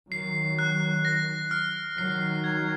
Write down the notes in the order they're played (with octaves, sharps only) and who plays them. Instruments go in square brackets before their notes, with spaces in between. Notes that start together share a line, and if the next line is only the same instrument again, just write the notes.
[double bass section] D#3 F#3 [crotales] C7
[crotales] F#6
A#6
F6
[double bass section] D#3 F#3 [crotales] C7
[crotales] G#6